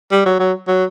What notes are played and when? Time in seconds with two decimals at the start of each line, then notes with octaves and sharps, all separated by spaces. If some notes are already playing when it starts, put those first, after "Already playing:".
0.11 G3
0.26 F#3
0.40 F#3
0.68 F#3